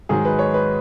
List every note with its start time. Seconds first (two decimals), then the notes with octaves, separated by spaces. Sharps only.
0.09 G#2 D#3 F#3 G#4
0.25 B4
0.39 C#5
0.54 B4